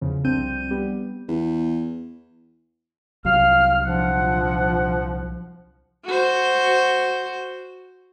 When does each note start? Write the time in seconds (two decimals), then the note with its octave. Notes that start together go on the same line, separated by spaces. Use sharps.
0.01 E2 C#3 F3
0.24 C2 F3 C4 D4 G6 D#7
0.71 G3 B3 G4
1.29 E2
3.25 C2 F#3 F5 F6
3.84 A#2 F3 D4 F#5
6.05 F#4 C5